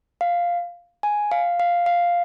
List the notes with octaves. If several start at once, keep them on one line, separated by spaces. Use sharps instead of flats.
F5
G#5
F5
F5
F5